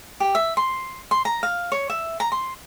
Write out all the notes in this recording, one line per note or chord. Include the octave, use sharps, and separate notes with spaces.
G4
E5
C6
C6
A#5
F5
C#5
E5
A#5
C6